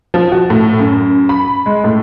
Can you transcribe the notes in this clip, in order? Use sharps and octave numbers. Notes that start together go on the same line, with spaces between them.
F3
F#4
A2
F#2
B5
G#3
A2